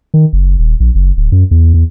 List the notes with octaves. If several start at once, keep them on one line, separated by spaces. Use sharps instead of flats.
D#3
F#1
D#1
A#1
F#1
D1
F#2
E2
E2